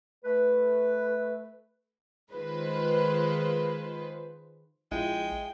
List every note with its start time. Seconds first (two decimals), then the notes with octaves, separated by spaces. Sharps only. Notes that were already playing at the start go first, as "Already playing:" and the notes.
0.25 A3 B4
2.32 D#3 G#3 F4 B4 C5
4.92 A#1 G#3 E4 F4 G5